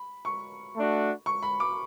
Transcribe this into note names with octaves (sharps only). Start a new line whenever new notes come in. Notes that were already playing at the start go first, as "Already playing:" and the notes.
Already playing: B5
C#6
A3 D4 F#4
C#6
B5
D6